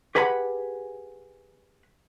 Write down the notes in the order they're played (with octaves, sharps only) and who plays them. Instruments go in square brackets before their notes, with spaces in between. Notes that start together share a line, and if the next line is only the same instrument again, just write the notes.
[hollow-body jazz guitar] G4 G#4 B4 F#5 A5 B5